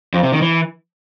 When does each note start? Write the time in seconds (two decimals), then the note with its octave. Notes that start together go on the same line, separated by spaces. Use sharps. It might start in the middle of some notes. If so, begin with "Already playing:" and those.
0.14 F2
0.23 C3
0.32 D#3
0.42 E3